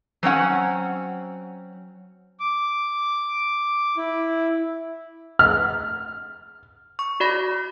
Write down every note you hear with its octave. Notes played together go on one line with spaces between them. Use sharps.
F#3 C4 C#4 F#5
D6
E4
F6
C#6
F#4 D5 B5 A#6